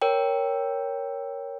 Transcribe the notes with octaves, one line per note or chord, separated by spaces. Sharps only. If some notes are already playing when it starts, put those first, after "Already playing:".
A#4 C#5 G5